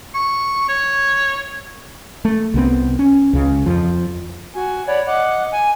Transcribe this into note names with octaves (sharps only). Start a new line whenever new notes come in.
C#6
C#5
A3
C2 B3 C4
C#4
C#2 C#3
F2 F3
F#4 G#5
C#5 D5 F#5 B5
D#5 F#5 D6
G#5